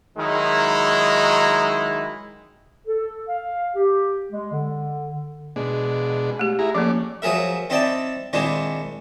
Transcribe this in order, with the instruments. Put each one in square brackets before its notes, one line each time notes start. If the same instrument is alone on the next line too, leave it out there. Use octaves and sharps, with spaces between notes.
[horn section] D#3 F#3 G#3 D#4 E4
[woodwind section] A4
F5
G4
G#3
D3
[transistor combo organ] B2 G#3 D4
[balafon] A3 G4
[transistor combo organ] E4 G#4 A#5
[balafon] F3 A#3 [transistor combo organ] C#4 A4 D5
[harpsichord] F3 F#3 G#4 A#4 E5
C4 D#4 E4 D5 G5 A5
A#2 D#3 G#3 C4 D4 E4